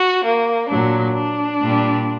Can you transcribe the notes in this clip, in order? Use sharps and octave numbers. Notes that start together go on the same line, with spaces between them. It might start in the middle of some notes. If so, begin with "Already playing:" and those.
Already playing: F#4
A#3
A#2 F#3 D4
D4
A#2 G3